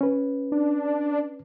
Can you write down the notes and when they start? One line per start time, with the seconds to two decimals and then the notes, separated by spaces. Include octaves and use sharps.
0.01 C#4 B4
0.52 D4